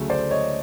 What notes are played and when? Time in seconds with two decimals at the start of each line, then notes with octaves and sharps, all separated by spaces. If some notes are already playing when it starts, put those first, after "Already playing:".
Already playing: D2 C#3 F#3 A3
0.10 C5 D5
0.31 C#5 D#5